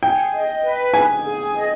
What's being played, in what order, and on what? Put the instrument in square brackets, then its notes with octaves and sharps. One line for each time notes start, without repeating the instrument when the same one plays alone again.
[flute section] G#4 [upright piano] G5
[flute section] D#5
B4
[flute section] G#4 [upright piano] G#5
[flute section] G#4
D#5